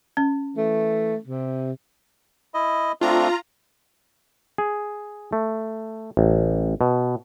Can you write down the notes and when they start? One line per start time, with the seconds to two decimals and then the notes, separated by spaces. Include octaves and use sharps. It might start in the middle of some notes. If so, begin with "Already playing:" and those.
0.17 C#4
0.56 E3 A3
1.27 C3
2.54 E4 D#5
3.01 A3 C4 D4 F4 A#5
4.58 G#4
5.33 A3
6.17 A1
6.81 B2